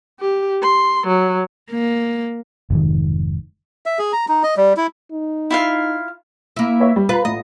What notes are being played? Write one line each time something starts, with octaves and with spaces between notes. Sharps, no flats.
G4
C6
F#3
A#3
F1 G#2 D#3
E5
G#4
A#5
D#4
D#5
G3
E4
D#4
E4 F4 F5
A#3 E4
B4 C#5 E5
G3
F4 B4 A#5 B5
A1 D#5